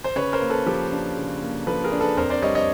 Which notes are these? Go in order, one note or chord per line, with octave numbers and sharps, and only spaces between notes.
C5
C#3 B4 C#5
A#4 C5
A#3
A4 B4
F3 G4 A4
D4
C#3
A#3
F3 A4 B4
G#4 A#4
D4
A4 B4
F2 A#4 C5
C5 D5
G3 C#5 D#5
C#5 D#5